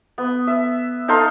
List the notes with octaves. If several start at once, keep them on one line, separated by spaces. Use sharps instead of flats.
B3
E5
D#4 A4 F5 C6